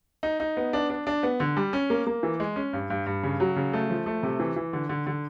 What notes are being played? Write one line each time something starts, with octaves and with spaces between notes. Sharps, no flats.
D#4
D#4
B3
D4
D4
D4
B3
D3
G3
C#4
A#3
A#3
E3
G#3
C#4
G2
G2
G2
C#3
F#3
C#3
A3
F3
A3
C3
E3
E3
D3
D3
D3